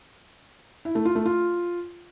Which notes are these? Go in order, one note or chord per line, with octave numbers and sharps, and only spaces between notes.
E4
A3
F4
A3
F4